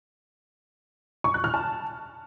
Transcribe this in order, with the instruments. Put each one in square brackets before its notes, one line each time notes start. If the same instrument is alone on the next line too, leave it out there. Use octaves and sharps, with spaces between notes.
[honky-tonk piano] C#6
F#6
F6
A5